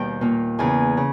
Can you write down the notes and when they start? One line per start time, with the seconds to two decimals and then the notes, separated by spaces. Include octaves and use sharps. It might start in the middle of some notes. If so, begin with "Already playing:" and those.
Already playing: D#2 B2 D#3 G3 G5
0.21 A#2 A#3
0.58 E2 C#3 E3 G#5
0.97 C#3